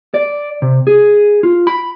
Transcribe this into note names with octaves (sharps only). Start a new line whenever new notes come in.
D5
C3
G#4
F4
B5